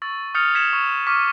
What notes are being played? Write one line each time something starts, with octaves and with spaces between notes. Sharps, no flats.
C#6 E6 A6
D#6 F6 G6 A6 C#7 F7
G#6 B6 C#7 E7
C#6
C#6 D6 F6 B6 D#7